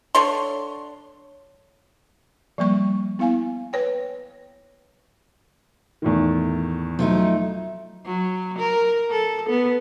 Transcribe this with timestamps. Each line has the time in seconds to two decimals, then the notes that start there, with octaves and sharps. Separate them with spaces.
0.15 D3 A4 C#5 C6
2.58 F3 G3 A#3 C#6
3.19 B3 E4 F5 G#5
3.73 B4 C#5 G5
6.02 E2 A2 D#3
6.99 F3 F#3 A3 D#4
8.05 F#3
8.59 A#4
9.11 A4
9.49 B3